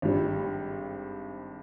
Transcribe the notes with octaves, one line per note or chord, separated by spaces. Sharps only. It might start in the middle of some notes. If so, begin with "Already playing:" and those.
G#1 G2 G3